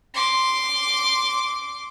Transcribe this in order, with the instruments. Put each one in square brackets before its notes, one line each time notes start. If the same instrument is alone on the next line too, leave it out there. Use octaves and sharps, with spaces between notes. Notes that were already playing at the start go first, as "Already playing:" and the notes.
[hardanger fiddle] C6 D6